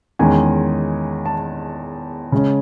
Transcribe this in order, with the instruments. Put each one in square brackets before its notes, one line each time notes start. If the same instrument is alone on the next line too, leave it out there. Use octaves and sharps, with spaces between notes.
[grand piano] E2 D#3 G#3 C#4 G#5
A5
C#3 G#3 C#4